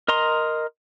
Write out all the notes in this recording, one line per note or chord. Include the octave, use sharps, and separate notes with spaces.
A#4 D#5 A#5 C6